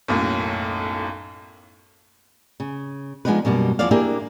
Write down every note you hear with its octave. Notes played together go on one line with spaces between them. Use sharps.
B1 F#2 A2 A#3
C#3
F3 G#3 B3 D4 D#4 B4
F#2 B2 G3 A#3
E2 F3 E4 C5 D5 F5
A#3 D4 E4 G4 G#4 A#4